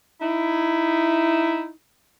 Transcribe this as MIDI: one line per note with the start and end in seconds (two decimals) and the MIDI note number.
0.21 1.69 63
0.21 1.69 64